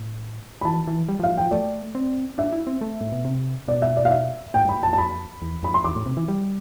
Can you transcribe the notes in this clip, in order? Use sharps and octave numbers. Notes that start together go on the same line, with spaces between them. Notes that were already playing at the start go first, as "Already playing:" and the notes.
Already playing: A2
B5
E3 A5
E3
G3
F3
F5
F3 G5
A3 D5
C4
D4 E5
E4
C4
A3
A2
B2
C3
B2 D5
E5
D5
F5
E5
A2 G5
G2
B5
A5
F2
A5
B5
E2
F2 B5
C6
E2 D6
A2
C3
E3
G3